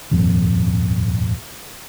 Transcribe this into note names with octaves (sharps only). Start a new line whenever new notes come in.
D#1 G#1 F2